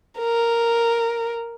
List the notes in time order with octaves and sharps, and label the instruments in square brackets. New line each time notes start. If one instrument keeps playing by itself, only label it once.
[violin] A#4